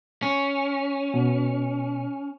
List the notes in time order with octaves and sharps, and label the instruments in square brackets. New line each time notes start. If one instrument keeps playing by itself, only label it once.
[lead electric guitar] C#4
[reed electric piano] B2